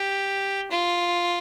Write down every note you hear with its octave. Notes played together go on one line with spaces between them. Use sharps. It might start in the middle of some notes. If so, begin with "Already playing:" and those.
Already playing: G4
F4